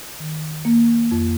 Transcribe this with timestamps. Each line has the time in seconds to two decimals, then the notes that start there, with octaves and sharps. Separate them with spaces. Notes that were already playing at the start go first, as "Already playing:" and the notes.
0.20 D#3
0.65 A#3
1.11 F2